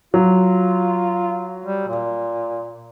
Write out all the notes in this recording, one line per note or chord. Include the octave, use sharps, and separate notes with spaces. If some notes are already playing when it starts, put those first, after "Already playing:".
F#3 F4
G3
A#2